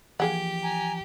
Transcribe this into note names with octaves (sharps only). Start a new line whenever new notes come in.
E3 F3 A#3 G4 G#4 F#5
G#5 A#5